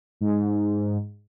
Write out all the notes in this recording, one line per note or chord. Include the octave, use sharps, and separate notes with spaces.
G#2